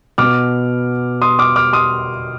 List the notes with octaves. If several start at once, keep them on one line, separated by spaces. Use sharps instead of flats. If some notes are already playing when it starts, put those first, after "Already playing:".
B2 B3 D6 F6
C6 D#6
D6 F6
D6 F6
C6 D#6